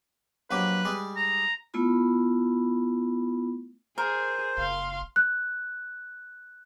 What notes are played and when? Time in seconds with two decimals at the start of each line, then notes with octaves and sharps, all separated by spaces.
0.51 A#1 F#3 G4 B4
0.85 G3 G#3
1.16 A#5
1.74 A3 B3 E4 F4 B5
3.98 G#4 A#4 C5
4.57 F#1 F5 C6
5.16 F#6